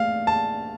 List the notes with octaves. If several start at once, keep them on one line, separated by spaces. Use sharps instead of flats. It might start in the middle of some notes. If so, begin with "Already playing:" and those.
Already playing: A3 F5
A5